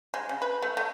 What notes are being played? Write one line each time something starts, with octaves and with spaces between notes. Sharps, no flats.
G#3
C#3
B4
A3
A3